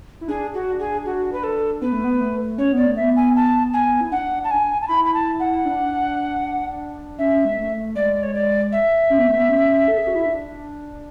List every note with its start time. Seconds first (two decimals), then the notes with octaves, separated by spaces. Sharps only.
0.21 E4
0.28 D4 G#4
0.54 F#4
0.80 G#4
1.06 F#4
1.32 B4
1.43 A4
1.82 B3 B4
1.92 A3
2.04 B3
2.21 A3
2.58 C#4 C#5
2.73 B3 D5
2.86 A3
2.96 B3 E5
3.16 G#5
3.36 A5
3.74 G#5
4.01 E4
4.12 D4 F#5
4.44 A5
4.51 G#5
4.82 A5
4.88 E4 B5
5.04 B5
5.14 A5
5.40 F#5
5.65 D4
7.19 C#4 E5
7.45 G#3
7.58 A3
7.95 G#3 D5
8.23 C#5
8.34 D5
8.72 E5
9.10 C#4
9.18 B3
9.28 A3
9.36 B3
9.49 C#4
9.88 A4
9.97 G#4
10.07 F#4
10.15 E4
10.26 D4